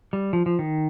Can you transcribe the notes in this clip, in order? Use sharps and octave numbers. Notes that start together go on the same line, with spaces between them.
G3
F3
F3
D#3